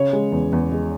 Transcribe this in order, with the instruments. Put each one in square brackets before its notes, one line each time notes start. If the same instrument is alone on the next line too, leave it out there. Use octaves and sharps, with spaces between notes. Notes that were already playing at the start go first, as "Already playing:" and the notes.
Already playing: [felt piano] C#3 C#5
G#3
E2
E2
G#3